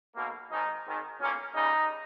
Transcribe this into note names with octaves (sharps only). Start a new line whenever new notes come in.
B1 B2 A#3
G#1 G#2 D#3 D#4
G#1 G#2 D#3
B1 A#2 A#3 C#4
D#2 C#3 G3 D#4